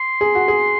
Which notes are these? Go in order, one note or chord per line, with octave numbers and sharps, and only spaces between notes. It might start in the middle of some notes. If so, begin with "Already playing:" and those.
Already playing: C6
G#4
F#4
G#4